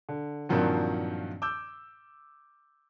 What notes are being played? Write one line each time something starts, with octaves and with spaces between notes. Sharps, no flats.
D3
G2 A#2 D#3 F3 F#3 C4
D6 E6 G6